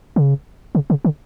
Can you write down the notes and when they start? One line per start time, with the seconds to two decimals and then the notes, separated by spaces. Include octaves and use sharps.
0.16 C#3
0.75 C#3
0.90 C#3
1.05 D3